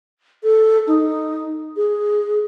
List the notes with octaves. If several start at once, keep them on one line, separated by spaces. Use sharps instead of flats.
A4
D#4
G#4